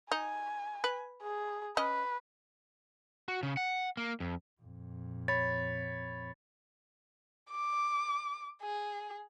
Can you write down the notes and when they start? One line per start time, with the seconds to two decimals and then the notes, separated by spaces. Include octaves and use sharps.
0.12 D#4 G#5
0.84 B4
1.22 G#4
1.77 C#4 B4 D#5
3.28 F#4
3.43 C#3
3.57 F#5
3.97 A#3
4.20 F2
4.61 F2 A#2
5.28 C#5 B5 A6
7.51 D6
8.62 G#4